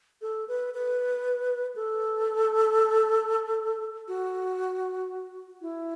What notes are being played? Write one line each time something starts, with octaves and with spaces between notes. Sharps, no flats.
A4
B4
B4
A4
F#4
E4